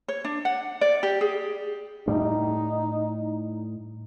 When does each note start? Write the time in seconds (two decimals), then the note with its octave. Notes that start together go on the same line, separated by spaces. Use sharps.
0.08 C#5
0.25 D4
0.45 F#5
0.81 D5
1.03 G4
1.21 G#4
2.07 A2 G3 D#4